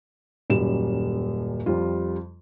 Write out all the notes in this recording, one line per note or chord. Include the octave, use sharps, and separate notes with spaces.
D#1 F#2 G3 E7
F2 G3 F4